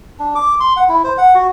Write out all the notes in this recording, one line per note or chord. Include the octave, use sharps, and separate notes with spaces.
D4
D6
C6
F#5
E4
C5
F#5
F#4